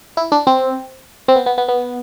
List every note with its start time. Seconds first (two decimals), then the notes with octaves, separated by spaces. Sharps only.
0.17 E4
0.32 D4
0.47 C4
1.28 C4
1.36 B3
1.46 B3
1.58 B3
1.68 B3